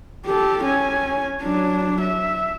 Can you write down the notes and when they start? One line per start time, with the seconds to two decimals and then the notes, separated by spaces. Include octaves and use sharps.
0.26 G4 A4
0.64 C#4 G#5
1.42 F#3 D4
2.01 E5